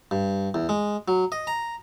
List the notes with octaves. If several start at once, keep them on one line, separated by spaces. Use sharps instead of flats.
G2
E2
G#3
F#3
D#5
A#5